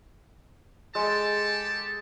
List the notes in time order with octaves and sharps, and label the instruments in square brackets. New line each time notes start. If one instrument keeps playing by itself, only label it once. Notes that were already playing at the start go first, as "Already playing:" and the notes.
[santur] G#3 [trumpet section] G4 A4 A5